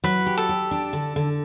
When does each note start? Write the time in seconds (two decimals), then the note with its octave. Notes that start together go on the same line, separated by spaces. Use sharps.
0.04 F#3 B4
0.26 G4
0.37 A4
0.49 G4
0.71 D4
0.93 D3
1.16 D3